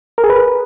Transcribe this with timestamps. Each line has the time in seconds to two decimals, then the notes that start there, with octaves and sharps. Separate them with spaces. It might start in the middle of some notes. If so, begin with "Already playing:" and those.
0.18 A#4
0.24 G#4
0.30 B4